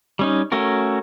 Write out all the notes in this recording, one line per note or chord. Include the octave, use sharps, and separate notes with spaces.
G3 C#4 D#4
A3 C#4 F#4 A#4